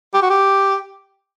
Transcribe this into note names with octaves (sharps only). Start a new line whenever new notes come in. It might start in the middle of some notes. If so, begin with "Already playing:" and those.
G4
F#4
G4